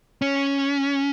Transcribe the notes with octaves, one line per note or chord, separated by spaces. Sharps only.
C#4